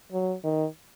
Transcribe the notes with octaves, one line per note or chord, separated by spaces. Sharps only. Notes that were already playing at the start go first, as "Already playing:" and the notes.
F#3
D#3